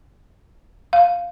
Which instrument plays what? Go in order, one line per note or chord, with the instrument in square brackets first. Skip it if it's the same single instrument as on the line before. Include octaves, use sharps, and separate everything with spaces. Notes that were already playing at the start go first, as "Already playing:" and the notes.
[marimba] F5